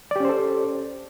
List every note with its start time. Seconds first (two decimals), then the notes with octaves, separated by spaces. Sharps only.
0.11 D5
0.16 G4
0.20 C#4
0.25 C5
0.29 A4